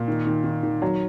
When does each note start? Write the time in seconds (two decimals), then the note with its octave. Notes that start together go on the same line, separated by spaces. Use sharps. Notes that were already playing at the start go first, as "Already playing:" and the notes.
Already playing: A#2
0.08 D#3
0.27 D#3
0.44 D#3
0.63 D#3
0.82 F#3